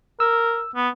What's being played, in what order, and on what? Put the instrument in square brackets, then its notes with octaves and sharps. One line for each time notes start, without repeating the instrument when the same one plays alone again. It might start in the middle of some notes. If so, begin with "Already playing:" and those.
[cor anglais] A#4 [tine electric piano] E6
[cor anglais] B3